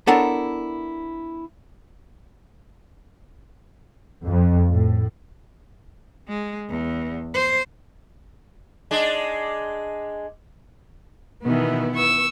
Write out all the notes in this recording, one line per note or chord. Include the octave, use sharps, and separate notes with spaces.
B3 D4 E4 A4 A#4 C#5
F2
A2
G#3
E2
C5
G#3 D4
B2 D#3 E3 B3 E4
C#6 E6